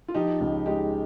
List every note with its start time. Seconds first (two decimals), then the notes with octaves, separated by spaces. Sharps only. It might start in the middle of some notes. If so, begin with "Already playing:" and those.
0.08 F4
0.14 F3 D#4 G4
0.40 C#2
0.66 G#3 D#4 G4